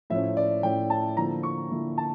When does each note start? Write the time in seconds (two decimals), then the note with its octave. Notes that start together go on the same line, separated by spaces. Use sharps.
0.10 A2 F3 C#4 E5
0.37 D5
0.63 A2 F3 C#4 G5
0.90 A5
1.17 D3 F3 A#3 E4 A#5
1.43 C#6
1.71 D3 F3 A#3 E4
1.98 A5